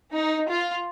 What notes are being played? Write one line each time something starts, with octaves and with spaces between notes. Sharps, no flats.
D#4
F4